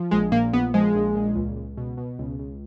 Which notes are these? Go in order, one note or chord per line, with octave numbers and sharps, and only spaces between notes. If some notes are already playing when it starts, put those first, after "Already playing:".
Already playing: F3
A#1 G#3
A#2 A#3
A#1 B3
F3 G#3
A#1
A#2
C#2
C#2
B2
B2
C#2
C#2